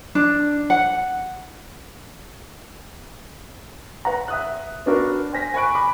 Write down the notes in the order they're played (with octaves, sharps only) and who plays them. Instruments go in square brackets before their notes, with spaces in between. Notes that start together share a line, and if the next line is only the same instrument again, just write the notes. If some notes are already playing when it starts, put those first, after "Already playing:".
[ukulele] D4
F#5
[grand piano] B4 F#5 A#5
E5 D#6 F#6
B3 D4 F#4 A#4
C5 G#5 A#6 B6
G#5 B5 C#6 F#6 D7
B5 D6